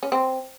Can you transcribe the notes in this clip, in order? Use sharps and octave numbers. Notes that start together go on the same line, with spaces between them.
C#4
C4